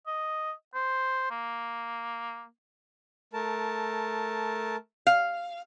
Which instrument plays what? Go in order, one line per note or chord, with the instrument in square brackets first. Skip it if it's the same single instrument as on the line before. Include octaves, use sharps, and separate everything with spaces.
[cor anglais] D#5
C5
A#3
[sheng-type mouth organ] A3 A#4 A5
[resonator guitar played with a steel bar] F5